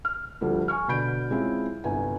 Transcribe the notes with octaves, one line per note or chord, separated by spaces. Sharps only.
F6
D2 F3 G3 A3
G#5 C#6 F6
B2 D3 B5 G6 D7
G#3 C4 C#4 E4 F4
G1 C2 G#5